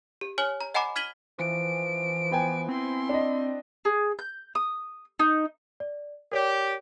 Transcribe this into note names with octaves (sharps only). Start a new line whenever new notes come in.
G4
C#5 G#5 F6 F#7
A#5
D#5 F#5 G#5 A#5 B5 D6
F6 G#6 B6 D#7 F#7 G7
E3 F3 D7
B3 G5 G#5
C4 E4 C6
D4 D#5
G#4
G6
D#6
D#4
D5
G4 A#4 C#5 D5